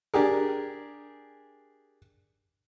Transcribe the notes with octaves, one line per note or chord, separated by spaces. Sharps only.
D4 G4 G#4 A#4